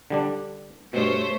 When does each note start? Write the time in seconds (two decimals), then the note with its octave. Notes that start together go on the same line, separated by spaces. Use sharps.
0.10 D3 G3 D4
0.93 G2 B2 A3 C5 C#5